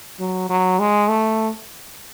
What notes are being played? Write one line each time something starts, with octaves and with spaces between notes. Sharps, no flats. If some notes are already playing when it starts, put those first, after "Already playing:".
F#3
F#3
G#3
A3